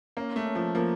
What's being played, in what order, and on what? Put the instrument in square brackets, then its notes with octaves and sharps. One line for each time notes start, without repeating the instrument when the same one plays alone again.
[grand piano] A#3 [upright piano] C#4
[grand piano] A3
[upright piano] C#4
[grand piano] F3
[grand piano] F3 [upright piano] A#3